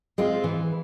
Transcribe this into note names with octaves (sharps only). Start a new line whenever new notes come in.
G#3 C4 F4
E3